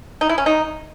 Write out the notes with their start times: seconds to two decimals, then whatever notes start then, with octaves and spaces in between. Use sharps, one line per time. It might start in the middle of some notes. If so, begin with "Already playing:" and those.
0.21 D#4
0.29 E4
0.38 C#4
0.46 D#4